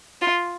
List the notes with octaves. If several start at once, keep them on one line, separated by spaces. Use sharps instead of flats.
F4